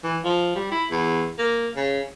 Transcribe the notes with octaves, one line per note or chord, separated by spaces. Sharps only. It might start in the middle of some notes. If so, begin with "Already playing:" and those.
E3
F3
G3
E4
E2
A#3
C#3